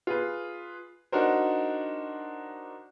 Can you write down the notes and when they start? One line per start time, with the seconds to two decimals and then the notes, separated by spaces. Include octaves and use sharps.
0.07 F4 G#4 B4
1.12 D4 D#4 F#4 A#4 C5